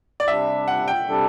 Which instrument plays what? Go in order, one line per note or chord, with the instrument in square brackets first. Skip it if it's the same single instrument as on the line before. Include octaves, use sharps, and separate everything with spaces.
[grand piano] D5
[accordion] C3 G3 D4 [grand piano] E5
[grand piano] F#5
G5
[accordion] C3 G3 D4 A4